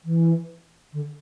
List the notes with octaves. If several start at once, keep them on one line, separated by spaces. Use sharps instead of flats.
E3
D3